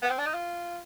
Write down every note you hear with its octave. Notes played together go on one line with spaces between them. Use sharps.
B3
C4
D4
D#4
F4